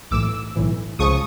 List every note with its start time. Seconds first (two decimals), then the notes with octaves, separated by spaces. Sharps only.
0.11 B1 A2 E3 D6 E6
0.56 B1 A2 E3
0.99 C#2 C#3 F3 C#6 D#6